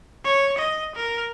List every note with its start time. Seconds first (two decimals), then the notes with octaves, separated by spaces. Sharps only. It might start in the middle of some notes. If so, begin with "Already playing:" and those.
0.25 C#5
0.58 D#5
0.96 A#4